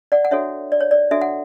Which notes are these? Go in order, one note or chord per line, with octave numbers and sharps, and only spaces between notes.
D5 F#5
F#5
D4 F#4 A4 C#5 E5
D5
C#5
D5
D4 F#4 A4 E5
F#5